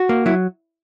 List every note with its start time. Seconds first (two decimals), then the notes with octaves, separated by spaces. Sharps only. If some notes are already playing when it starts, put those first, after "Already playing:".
Already playing: F#4
0.09 A#3
0.26 F#3 E4